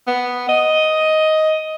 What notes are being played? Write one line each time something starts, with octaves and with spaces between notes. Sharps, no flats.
B3
D#5